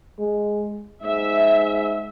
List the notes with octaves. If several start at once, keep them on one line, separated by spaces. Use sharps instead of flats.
G#3
G#2 E5